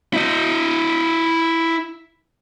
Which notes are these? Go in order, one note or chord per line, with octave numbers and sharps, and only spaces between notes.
E4 D#5